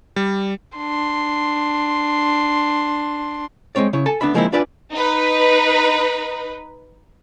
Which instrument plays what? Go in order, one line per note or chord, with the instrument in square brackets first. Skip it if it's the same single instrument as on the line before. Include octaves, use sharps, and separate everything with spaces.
[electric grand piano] G3
[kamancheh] D4 C6
[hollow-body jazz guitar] G#3 A#3 C4 C#5 D5
C#3 E4 C#5
A4 G#5 A5
D2 B3 D4 E5 B5
F3 G#3 A#3 C4 D#4 E4
D4 F4 B4 D5 E5 G#5
[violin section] D#4 B4